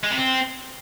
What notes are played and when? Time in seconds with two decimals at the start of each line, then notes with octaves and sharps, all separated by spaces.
0.04 G#3
0.11 C3
0.18 C4